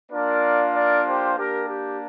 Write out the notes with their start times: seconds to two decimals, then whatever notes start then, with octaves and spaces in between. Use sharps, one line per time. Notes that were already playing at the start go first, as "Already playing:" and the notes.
0.11 A#3 D4 F4 A#4 D5
0.74 A#4 D5
1.06 G4 C5
1.37 A#3 D4 G4 A#4
1.68 G4